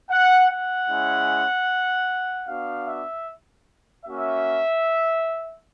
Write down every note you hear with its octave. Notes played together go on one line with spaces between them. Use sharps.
F#5
F#5
G#3 C#4 E4
B3 D4 F#4 F5
E5
A#3 C#4 F#4 E5